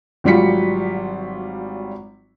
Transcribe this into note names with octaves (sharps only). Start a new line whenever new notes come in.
G#1 F#3 G3 F4 B6 C#7